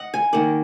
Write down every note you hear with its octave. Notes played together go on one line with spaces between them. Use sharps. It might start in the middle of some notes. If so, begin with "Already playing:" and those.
Already playing: D#5 F#5
G#5
D#3 A#3 F#5